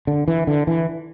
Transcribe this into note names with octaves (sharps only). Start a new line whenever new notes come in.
D3
E3
D3
E3